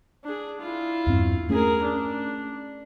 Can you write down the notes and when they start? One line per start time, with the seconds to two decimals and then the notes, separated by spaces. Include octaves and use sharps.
0.24 D4 G#4
0.61 E4 F4
1.06 E2 G2 C4
1.49 A3 C#4 G#4 A#4
1.84 D4